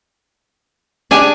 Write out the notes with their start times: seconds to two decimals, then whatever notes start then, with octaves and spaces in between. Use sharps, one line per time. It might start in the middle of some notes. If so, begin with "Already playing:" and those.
1.11 D4 G4 G#4 D5 G#5